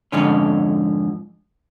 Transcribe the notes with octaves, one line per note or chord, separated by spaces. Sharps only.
F2 G#2 D3 C#4